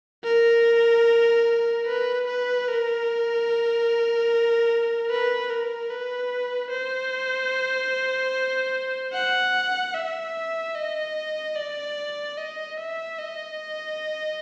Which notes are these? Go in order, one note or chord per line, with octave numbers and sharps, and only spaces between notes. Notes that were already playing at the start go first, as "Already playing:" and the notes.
A#4
B4
B4
A#4
B4
A#4
B4
C5
F#5
E5
D#5
D5
D#5
E5
D#5